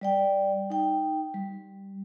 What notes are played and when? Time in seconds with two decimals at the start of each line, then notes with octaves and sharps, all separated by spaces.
0.01 G3 D5 G5
0.70 D#4 G5
1.34 G3